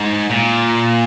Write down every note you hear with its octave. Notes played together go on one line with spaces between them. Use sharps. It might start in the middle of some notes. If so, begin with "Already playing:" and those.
Already playing: G#2
A#2